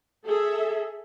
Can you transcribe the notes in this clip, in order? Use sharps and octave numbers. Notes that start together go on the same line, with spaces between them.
G#4 A4 E5